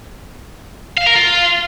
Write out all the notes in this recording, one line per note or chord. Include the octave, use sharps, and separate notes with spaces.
F5
A#4
F4